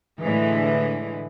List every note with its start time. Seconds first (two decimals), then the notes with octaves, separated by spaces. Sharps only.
0.21 A2 D3 E3 G#3